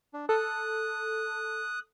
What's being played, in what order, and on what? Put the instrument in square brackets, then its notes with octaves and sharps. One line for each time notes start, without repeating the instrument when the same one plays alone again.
[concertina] D4
[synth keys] A4 [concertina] D#6 F#6